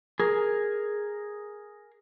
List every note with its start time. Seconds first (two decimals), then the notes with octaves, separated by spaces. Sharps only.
0.20 G#4 A#4